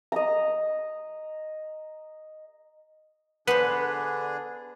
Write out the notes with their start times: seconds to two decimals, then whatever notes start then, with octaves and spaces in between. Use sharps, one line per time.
0.12 D#5 A#5
3.48 D3 B3 D4 G#4 B4 C5